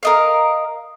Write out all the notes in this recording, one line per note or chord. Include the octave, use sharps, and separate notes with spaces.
A#4 D#5 F5